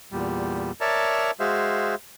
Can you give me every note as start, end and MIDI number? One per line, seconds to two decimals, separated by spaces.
0.12 0.71 40
0.12 0.71 46
0.12 0.71 55
0.81 1.31 70
0.81 1.31 73
0.81 1.31 74
0.81 1.31 76
0.81 1.31 81
0.81 1.31 82
1.40 1.95 56
1.40 1.95 66
1.40 1.95 68
1.40 1.95 72
1.40 1.95 76
1.40 1.95 77